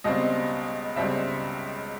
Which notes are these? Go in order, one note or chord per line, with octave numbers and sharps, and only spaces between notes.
C#2 B2 G3 C4 D#5
C#2 B2 G3 C4 E5